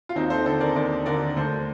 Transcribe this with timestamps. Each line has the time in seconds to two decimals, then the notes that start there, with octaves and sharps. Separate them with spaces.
0.09 F4
0.16 D#2 C4 D#4
0.30 A4 C5
0.46 D3 A4 C5
0.60 A#4 D5
0.76 D#2 A#4 D5
1.06 D3 A#4 D5
1.36 D2 A4 C5